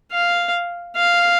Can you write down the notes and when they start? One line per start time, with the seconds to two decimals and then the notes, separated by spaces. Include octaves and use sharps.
0.12 F5
0.96 F5